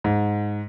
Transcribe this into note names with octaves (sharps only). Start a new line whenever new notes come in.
G#2